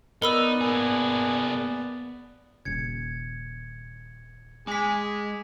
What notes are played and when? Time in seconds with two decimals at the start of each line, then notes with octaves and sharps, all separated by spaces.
0.22 B3 D#4 A#4 D5 B5 E6
0.61 A#3 G#4
2.65 D#1 C#3 G#6 C#7
4.67 G#3 G#4 G#5 D6 B6